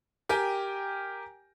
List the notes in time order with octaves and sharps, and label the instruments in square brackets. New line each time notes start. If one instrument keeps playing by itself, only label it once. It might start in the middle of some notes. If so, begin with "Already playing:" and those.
[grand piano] G4 A#4 G5 G#5